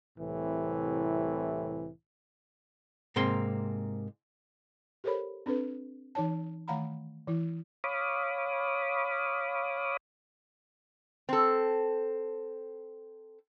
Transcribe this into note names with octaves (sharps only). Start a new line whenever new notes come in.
C2 A2 C3 E3
G#2 C3 A#3 C4 C6
G4 A4 A#4 C5 C#5 B5
C4 D4 A4 B4
E3 D#4 C#5 A5
D#3 A3 F5 F#5 A#5 B5
E3 E4
C#5 F5 B5 D6 D#6
C4 A4